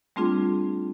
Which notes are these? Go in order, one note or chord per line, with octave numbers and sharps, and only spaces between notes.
G3 A3 C4 D4 F4 G#4